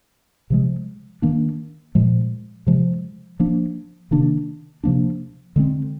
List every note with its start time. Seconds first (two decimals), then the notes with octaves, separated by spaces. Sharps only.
0.50 C3 F3 G#3
1.22 D#3 A#3 D4
1.95 A#2 F3 G#3
2.67 C3 F3 G#3
3.40 F3 A#3 D4
4.11 C3 D#3 A#3 D4
4.84 C3 F3 A#3 D4
5.56 D3 G#3 C4